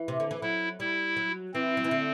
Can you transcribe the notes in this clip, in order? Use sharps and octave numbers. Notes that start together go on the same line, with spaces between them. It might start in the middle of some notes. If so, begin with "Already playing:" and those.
Already playing: E3
C3
D3
E3
F#3 E4
G3 E4
F#3
E3 C4
F#3
E3
D3